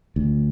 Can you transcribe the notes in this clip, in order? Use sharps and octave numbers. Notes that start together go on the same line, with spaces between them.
D2